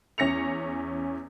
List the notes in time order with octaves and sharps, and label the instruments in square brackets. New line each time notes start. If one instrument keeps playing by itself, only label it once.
[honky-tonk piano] E2 C#4 A#6 C#7 F7